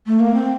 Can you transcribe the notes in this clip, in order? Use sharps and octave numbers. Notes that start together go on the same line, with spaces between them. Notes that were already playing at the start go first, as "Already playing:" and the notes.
A3
A#3
C4